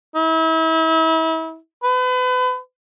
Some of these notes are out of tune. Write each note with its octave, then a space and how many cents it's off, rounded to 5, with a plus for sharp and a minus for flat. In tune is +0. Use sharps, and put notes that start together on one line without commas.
E4 -35
B4 +35